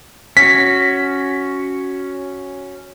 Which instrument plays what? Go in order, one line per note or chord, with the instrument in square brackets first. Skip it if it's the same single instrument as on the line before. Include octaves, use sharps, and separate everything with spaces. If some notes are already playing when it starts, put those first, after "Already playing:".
[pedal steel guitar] C#4 F#4 [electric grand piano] B6